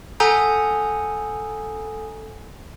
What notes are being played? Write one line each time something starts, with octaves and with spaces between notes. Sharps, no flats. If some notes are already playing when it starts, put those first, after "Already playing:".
A4 F#5 G#5 A#5 D#6 G6